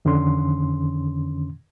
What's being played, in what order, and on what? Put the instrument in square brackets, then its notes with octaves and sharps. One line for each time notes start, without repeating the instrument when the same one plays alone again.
[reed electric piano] F2 D3 D#3 C#4 C6